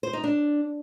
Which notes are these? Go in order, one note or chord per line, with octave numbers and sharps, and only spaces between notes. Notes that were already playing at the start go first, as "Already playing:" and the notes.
C5
D#4
D4